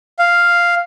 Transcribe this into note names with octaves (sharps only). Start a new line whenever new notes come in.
F5